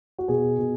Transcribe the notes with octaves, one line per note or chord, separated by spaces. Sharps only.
F#4
B2 G#4
B2